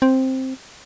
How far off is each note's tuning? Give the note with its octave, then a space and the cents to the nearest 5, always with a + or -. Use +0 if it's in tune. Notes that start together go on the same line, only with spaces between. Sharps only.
C4 +5